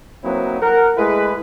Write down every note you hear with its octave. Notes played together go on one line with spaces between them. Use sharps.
F#3 A#3 C4 D#4 E4 B4
A#4 F#5
G#3 A3 E4 B4